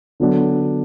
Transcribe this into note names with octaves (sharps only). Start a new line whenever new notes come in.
D3 F#3 B3 D4